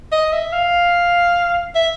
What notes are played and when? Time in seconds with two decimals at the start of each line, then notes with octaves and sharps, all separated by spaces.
0.12 D#5
0.33 E5
0.52 F5
1.75 E5